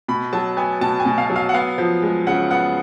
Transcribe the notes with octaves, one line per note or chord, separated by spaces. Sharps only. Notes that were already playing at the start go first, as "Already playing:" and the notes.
B2 B5
F#3 A5
B3 G#5
B2 A5
G#5
B2
F5
F#3
F5
F#5
B3 F5
F3
G#3
C#3 F#5
B3 F#5